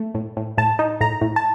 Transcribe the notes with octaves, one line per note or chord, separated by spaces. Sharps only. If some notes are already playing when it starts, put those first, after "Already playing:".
Already playing: A3
A2
A2
A2 A5
D#4
A2 A#5
A2
A5